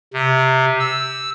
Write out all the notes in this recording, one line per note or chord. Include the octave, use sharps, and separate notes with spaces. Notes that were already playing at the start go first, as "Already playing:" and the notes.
C3
E6